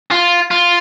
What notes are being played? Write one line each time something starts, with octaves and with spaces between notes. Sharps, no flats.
F4
F4